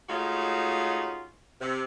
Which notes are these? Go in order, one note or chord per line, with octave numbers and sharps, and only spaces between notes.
G#3 A3 C#4 D#4 F4 F#4
C3